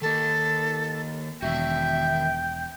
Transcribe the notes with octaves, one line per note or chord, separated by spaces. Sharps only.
D#3 A#3 A4
E1 D#3 F#4 E5 G5